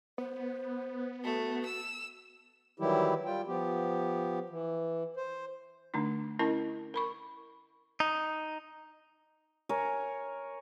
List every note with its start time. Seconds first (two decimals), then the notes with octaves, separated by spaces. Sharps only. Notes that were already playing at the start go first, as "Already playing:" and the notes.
0.18 B3 C5
1.24 A3 F#4
1.65 E6
2.80 D#3 E3 F#3 G3 E4 G4
3.25 G3 F4 G5
3.47 F3 B3 G4
4.50 E3
5.16 C5
5.94 D3 A3 D4 D#4
6.39 C#4 E4 A#4 D#5 A5
6.94 A#4 B5 C#6
8.00 D#4
9.69 A#4 C#5 G#5